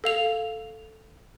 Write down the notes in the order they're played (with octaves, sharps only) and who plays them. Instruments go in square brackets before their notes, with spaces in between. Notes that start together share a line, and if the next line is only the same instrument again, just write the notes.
[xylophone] A4 F5 F7